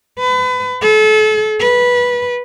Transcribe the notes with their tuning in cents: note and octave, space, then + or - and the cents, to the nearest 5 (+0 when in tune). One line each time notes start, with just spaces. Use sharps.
B4 +30
A4 -35
B4 -15